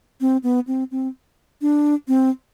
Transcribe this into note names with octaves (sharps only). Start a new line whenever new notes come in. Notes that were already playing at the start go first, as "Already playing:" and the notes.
C4
B3
C4
C4
D4
C4